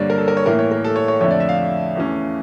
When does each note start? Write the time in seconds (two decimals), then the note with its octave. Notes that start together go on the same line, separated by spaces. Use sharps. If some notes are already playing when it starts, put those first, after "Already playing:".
Already playing: G2 D3 G3 A#3 C#5 D5
0.10 A#4
0.18 A4
0.28 A#4
0.37 C#5
0.46 A2 E3 A#3 A#4
0.59 C#5
0.72 A#4
0.84 A4
0.96 C#5
1.08 C#5
1.21 F2 D3 A3 C#5
1.30 D5
1.40 E5
1.49 F5
1.95 E2 E3 A3 C#4